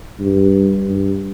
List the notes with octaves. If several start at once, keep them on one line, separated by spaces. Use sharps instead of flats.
G2
G2